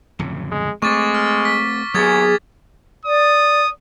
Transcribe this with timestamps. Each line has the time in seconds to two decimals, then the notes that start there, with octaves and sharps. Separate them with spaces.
0.19 D1 F2 C#3
0.52 G#3
0.82 G#3 A3 C4 C#6 D6 A6
1.14 F6
1.45 B6
1.94 D#2 F#3 B3 G#4 D#6 G#6 A6
3.05 D5 D#6